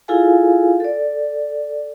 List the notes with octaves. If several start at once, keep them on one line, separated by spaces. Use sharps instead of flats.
E4 F4 G#4 A4 F5 G#5
A4 D5